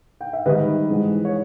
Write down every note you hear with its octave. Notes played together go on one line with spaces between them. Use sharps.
G5
E5
G#2 D#3 G3 B4 D#5
G#2 E3 G#3
C#5